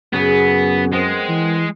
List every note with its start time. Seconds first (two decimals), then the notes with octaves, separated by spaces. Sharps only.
0.13 F#2 C#3 F#3 B3 G#4
0.92 G#3 B3 C4 A#4
1.29 E3